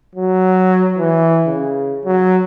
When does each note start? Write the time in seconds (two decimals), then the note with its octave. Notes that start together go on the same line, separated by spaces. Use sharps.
0.15 F#3
0.98 E3
1.47 C#3
2.05 F#3